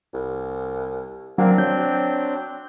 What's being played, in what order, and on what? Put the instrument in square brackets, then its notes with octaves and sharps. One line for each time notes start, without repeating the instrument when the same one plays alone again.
[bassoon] C2
[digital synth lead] F#3 [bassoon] A#3 [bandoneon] C4 D4
[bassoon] F#3 [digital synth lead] G6
[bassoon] F#3